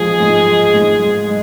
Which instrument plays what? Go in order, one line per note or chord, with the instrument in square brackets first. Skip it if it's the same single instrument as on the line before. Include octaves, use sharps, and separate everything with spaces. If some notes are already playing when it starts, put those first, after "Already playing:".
Already playing: [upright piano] F3 G#3 [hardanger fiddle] G#4
[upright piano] G#2
G#3
G#2
G#3
G#3